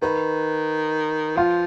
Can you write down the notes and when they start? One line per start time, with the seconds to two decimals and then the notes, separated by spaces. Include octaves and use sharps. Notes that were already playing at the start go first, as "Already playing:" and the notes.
0.02 D#3 B4
1.37 F3 F4